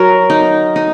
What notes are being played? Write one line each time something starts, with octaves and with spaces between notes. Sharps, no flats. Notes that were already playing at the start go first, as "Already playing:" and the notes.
Already playing: F#3 A#4
D#4
D#4